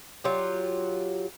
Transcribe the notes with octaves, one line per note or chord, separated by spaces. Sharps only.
F#3 F4 G4